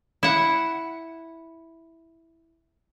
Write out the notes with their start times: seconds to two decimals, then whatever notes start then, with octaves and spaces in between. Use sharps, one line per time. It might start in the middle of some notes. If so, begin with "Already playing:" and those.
0.23 E4 F#5